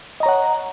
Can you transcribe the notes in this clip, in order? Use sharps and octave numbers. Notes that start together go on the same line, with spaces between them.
C#5 D#5 F#5 A#5